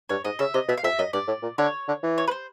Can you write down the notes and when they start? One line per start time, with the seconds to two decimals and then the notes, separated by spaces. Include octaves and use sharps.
0.09 G2 C#5
0.25 G#2 D#5
0.39 C#3 E5
0.54 C3 D#5
0.68 B2 E5
0.77 F5
0.83 F2 E5
0.99 F#2 D#5
1.13 G2 D5
1.28 A2
1.43 A#2
1.58 D3 C#5
1.88 D3
2.03 E3
2.18 C#5
2.28 B4
2.31 C5